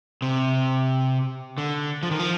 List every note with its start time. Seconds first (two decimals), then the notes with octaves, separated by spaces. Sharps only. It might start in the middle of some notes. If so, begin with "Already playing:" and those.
0.22 C3
1.58 D3
2.03 F3
2.11 D#3
2.19 F3